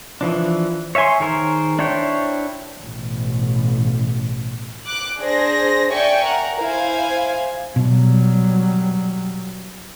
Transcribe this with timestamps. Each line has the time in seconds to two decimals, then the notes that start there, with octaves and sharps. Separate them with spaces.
0.21 E3 F3 D4
0.95 C#5 E5 F5 G#5 C6
1.20 D#3 G#4 A#4 C5 C#5
1.79 D4 E4 C5 C#5 G5
2.80 A1 B2
4.84 D6 F#6
5.20 D4 G#4 C5 A#6
5.90 D5 E5 G5 G#5 C#6
6.23 A#4 F#5
6.59 E4 C5 F5 G#5
7.76 B2 F#3 G3